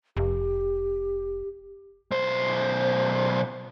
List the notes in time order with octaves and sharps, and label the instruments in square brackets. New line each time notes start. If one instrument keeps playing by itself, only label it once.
[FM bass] F1 [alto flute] G4
[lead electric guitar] B1 C5